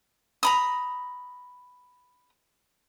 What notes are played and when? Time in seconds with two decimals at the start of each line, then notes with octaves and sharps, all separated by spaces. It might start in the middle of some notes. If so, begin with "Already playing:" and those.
0.43 A#5 B5 D#6